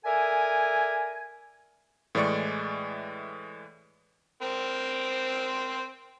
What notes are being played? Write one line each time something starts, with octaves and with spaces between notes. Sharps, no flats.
A4 A#4 D5 E5 G#5
A2 E3 G#3 D5 C#6 C#7
C4 A#4 C5